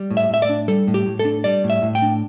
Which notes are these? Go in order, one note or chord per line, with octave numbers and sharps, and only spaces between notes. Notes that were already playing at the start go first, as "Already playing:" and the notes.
Already playing: G3
A2
E5
A2 E5
D5
D4
G3 A4
A2
G4
A2
A4
D4
G3 D5
A2
E5
A2
G5
D4